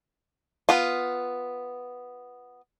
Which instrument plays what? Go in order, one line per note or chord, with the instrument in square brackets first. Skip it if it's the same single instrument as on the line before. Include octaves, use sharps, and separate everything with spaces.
[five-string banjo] B3 F4